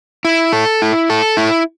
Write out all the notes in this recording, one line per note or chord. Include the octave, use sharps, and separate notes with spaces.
E4
A4
E4
A4
E4